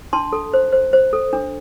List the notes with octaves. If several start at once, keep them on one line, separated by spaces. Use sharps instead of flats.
D4 A5 C6
A4
C5
C5
C5
A4
D4